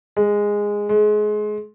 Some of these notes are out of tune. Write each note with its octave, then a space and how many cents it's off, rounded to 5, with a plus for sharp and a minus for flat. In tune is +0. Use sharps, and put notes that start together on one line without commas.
G#3 -10
G#3 +25